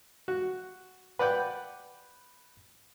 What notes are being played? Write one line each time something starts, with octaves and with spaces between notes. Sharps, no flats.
F#4
B4 D5 F#5 G5